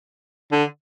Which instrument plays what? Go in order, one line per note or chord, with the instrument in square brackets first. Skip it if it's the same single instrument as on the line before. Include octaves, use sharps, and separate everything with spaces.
[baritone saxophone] D3